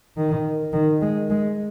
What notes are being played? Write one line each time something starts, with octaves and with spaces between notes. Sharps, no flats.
D#3
D#3
G#3
G#3